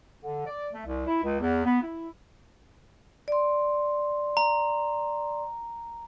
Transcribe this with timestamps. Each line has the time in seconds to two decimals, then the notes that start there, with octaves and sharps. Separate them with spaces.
0.22 D3
0.46 D5
0.73 A3
0.85 C2
1.06 E4
1.23 C#2
1.40 E2
1.64 B3
1.81 E4
3.28 D5 C6
4.37 A#5